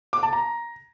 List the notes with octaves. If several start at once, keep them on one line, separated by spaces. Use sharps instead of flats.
D6
A5
A#5